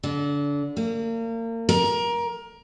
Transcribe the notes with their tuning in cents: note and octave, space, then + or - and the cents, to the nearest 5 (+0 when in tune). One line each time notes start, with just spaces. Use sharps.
D3 -30
A#3 -35
A#4 +20